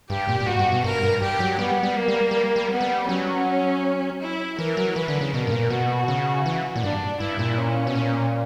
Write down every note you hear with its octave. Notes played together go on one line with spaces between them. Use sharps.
G2 G4
A#2
A#2
G2 F#4
G2
B2
G2 A#4
G2
G2 G4
F#3
G3 B3
G3
A#3
G3
G3
G3
B3
G3
F#3 C#4
E4
E3 A#4
F#3
E3 B4
D3
C#3
B2 A#4
G2
A#2
B2 F#4
C#3
E3
A#2
G2 D4
G2 E4
A#2
C#4
B2
A#2